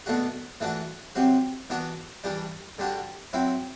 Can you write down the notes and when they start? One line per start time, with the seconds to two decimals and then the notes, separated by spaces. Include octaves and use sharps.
0.06 B2 A3 D4 F#4
0.61 E3 A3 D4 F#4
1.15 C3 F#3 C4 F#4
1.70 E3 B3 D4 F#4
2.24 E3 G3 D4
2.78 D3 G3 D4 F#4
3.33 F#3 C4 E4